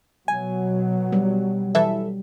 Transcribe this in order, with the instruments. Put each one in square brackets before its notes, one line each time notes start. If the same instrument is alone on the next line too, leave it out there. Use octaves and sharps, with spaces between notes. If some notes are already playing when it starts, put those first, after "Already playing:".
[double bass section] B2 F#3 [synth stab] G#5
[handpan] G3
[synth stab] E3 A4 E5